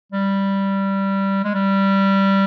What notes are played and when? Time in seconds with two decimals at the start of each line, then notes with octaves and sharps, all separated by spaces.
0.12 G3
1.44 G#3
1.54 G3